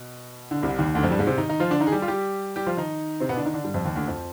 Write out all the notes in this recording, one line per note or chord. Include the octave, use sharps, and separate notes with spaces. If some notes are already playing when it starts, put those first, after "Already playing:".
Already playing: B2
D3
C2 C3
D#2 D#3
D2 D3
F2 F3
G2 G3
G#2 G#3
C3 C4
D#3 D#4
D#3 D#4
F3 F4
D3 D4
D#3 D#4
G#4
G3 G4
F4
G3 G4
G3 G4
F3 F4
D#3 D#4
C3 C4
B2 B3
D3 D4
D#3 D#4
D3 D4
G2 G3
F2 F3
D#2 D#3
D2 D3
F2 F3